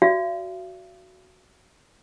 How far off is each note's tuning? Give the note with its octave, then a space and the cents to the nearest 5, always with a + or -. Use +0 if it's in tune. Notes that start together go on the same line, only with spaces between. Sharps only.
F#4 +0 D5 +0 F5 -45